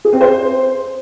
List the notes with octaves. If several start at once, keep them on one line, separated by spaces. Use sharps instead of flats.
G#4
C4
C5